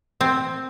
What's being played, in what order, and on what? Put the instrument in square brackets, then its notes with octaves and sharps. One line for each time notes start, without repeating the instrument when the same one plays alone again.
[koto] C4